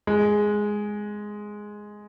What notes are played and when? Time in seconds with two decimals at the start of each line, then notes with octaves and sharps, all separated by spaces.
0.07 G#3